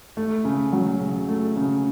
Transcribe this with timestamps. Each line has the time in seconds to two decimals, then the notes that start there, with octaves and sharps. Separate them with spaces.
0.17 A3
0.45 C#3
0.73 F#3
1.00 C#3
1.28 A3
1.56 C#3